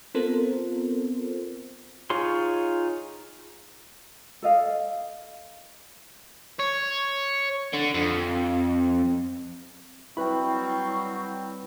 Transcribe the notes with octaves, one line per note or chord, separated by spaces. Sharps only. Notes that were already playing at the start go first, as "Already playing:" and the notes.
B3 C4 F4 A4 A#4 C5
D#4 F4 G#4 C#5 C6
A4 D#5 F5
C#5
D3
F2
F#3 G3 C4 E4 B4 G5 B5 C#6